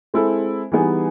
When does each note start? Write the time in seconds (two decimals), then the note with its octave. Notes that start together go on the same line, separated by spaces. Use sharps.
0.14 G#3 C4 E4 A4
0.72 E3 G3 B3 D#4 G#4